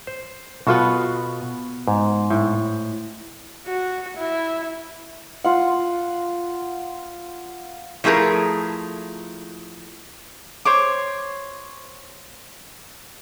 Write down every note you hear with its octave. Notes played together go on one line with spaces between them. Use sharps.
C5
B2 B3 F4 F#4 A4
G#2
A2
F#4
E4
F4 F#5
F3 A3 E4 G#4 A#4
C5 C#5 D6